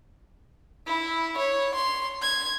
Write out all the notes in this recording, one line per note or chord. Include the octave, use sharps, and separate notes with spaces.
E4
C#5
C6
G#6